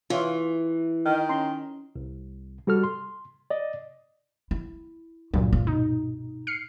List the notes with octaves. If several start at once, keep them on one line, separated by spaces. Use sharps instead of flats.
E3 F4 C#5 E5
D#3
C#4 A#5 C6
C2
G3 F#4 A4 F6
C6
D5 D#5
E4
C#2 G2 A#2 F#3
F4
B2 D#4
F6 C7 C#7